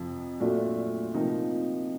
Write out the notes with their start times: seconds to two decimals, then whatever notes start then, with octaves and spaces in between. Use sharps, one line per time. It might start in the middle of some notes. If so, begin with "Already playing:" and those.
Already playing: F2 C3 F3
0.40 A#2 F#3 A3 D4 F#4
1.14 C3 F3 A#3 D#4